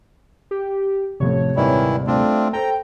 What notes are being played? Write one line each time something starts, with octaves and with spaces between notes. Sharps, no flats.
G4
A1 F2 C3 A3 C#5
D#1 G#1 D#3 E3 E4 D5
A3 C4 D4 F4
A4 C5 G5 A#5